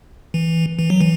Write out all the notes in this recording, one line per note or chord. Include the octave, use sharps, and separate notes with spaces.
E3
E3
F#3
E3